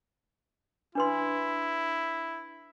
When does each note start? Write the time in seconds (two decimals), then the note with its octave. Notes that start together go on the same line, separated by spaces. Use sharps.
0.95 D4 E4 B4 C6